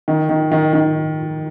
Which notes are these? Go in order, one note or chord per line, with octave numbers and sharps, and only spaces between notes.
D#3
D#3
D#3
D#3